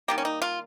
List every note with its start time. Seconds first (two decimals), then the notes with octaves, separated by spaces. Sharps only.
0.08 D#3 G3 A#3 G4
0.18 C#4
0.25 D#4
0.42 F4